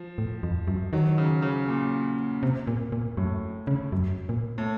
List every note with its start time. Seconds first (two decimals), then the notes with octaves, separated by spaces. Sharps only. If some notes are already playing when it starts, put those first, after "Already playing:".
Already playing: F3
0.18 A2
0.43 F2
0.67 F#2
0.93 D#3 F#3
1.18 C#3
1.42 C#3
1.68 A#2
2.43 C3
2.67 A#2
2.92 A#2
3.17 F#2 A2
3.67 C#3
3.92 F#2
4.29 A#2
4.58 A2